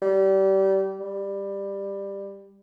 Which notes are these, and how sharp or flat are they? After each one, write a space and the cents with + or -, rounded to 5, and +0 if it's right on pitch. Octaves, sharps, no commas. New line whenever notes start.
G3 -25
G3 +15